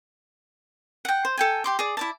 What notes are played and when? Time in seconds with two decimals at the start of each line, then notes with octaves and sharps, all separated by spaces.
1.05 F#5 G5
1.25 C5
1.37 A4 G5 G#5
1.64 G4 C6 D6
1.79 G#4 D5
1.97 E4 D5 A5